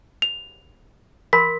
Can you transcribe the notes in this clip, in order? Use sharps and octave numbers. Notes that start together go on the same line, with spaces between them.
F7
A#4 B5 C6 B6